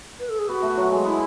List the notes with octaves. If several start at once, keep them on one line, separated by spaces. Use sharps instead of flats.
B4
A4
G#4
B3 F#4
A3
F#3
G#3
B3 E4